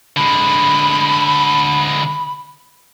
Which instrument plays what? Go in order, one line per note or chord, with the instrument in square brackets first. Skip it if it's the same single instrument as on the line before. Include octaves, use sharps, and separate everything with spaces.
[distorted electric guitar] D3 G#3 [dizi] B5